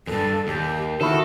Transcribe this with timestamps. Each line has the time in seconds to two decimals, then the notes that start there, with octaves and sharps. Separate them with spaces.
0.07 E2 G2 A4
0.47 D#2 G4
1.01 D#3 E4 F#4 A4